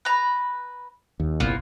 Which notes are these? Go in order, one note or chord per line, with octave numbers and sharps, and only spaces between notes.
B4 A#5
D#2
G1 C2 A#2 A#3 B3 F4